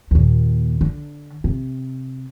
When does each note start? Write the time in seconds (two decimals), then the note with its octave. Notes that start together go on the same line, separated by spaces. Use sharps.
0.11 D#2 A#2
0.81 D3
1.44 C3